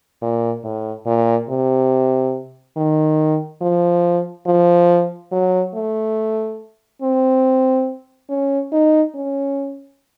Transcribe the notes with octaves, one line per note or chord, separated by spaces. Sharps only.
A#2
A2
A#2
C3
D#3
F3
F3
F#3
A3
C4
C#4
D#4
C#4